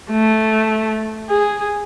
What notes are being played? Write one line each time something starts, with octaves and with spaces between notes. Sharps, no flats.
A3
G#4